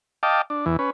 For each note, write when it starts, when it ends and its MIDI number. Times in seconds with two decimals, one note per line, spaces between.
0.23 0.42 75
0.23 0.42 77
0.23 0.42 79
0.23 0.42 81
0.23 0.42 86
0.50 0.65 62
0.66 0.77 40
0.66 0.77 52
0.79 0.90 61
0.79 0.90 71